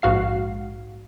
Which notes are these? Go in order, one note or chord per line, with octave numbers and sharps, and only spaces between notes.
A#1 G#2 F#4 F5 C7